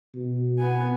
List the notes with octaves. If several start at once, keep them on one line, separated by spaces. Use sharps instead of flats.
B2
B3 G#5